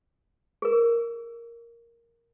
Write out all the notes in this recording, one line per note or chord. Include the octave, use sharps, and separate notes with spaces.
G#4 A#4